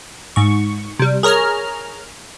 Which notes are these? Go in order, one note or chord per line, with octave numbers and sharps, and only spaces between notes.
G#2 C#6
C3 G3
G#4 A#4 C#5 A#5 F6